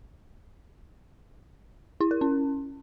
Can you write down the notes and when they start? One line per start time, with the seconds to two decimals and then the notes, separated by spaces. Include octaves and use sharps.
2.01 E4
2.11 A#4
2.21 C#4